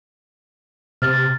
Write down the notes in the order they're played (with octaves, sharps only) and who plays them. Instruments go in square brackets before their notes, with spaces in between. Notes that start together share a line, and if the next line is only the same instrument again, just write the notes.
[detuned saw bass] C3 [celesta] F6 A6